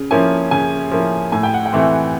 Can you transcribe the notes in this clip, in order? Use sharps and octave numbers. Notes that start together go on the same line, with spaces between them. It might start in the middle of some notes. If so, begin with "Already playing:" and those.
Already playing: C#3
F3 A#3 C#4 E4 G#5
C#3 G#5
F3 A#3 C#4 E4
A2 G#5
G5
F#5
G5
E3 A3 C4